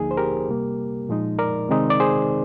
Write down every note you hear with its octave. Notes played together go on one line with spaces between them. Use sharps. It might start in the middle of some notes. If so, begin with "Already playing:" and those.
Already playing: D2 D3 F3 A#3 D#4 G#4
C5
G4 A#4
C3 G3 A#3
A#2 F3 G#3 D#4
A#4 D5
C3 D#3 G#3 C4 D#4
D5
G#4 C5